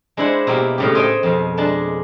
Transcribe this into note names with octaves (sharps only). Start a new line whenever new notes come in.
G#3 D4 E4 C5 F#5
B2 A#3 E4 G4
A2 C#3 G4
A4 C5 C#5 D#5 G5 G#5
F2 B2
G#3 D4 A5